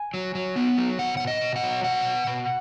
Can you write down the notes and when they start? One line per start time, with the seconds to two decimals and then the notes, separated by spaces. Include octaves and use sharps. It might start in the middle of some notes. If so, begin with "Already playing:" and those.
Already playing: G#5
0.14 F#3
0.35 F#3
0.56 B3
0.78 F#3
0.99 B2 F#5
1.17 B2 F#5
1.27 D#5
1.41 B2
1.56 F#5
1.63 F#3
1.84 B2 F#5
2.05 B2
2.27 B2